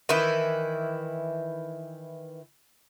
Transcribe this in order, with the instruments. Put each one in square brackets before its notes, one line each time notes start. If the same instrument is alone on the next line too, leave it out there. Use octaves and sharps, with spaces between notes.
[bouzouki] D#3 E3 E4